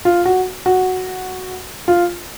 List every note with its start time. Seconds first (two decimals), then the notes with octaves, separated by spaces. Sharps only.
0.05 F4
0.25 F#4
0.66 F#4
1.88 F4